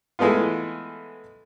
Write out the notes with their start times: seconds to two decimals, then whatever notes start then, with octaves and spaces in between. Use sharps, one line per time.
0.19 E3 G#3 A3 B3 F4